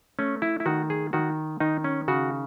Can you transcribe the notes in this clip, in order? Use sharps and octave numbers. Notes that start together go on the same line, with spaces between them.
A3 C#4
E4
E4
D#3 F#4
G#4
D#3 F#4
D#3 D#4
C#4
C#3 F#4